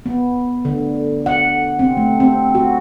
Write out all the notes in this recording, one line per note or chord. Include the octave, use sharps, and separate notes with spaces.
B3
D3
F#5
C4
A3
C4
F#4